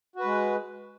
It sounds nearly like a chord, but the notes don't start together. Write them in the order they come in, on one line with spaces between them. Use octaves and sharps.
F#4 B4 G#3